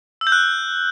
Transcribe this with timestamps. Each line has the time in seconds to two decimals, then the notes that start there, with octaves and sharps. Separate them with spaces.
0.21 E6
0.27 G6
0.32 F#6